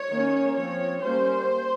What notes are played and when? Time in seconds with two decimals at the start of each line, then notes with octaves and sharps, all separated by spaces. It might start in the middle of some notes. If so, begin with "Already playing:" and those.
Already playing: C#5
0.09 D#3 A#3 C#4
0.57 F3 C4 C#5
1.04 G3 A#3 C#4 C5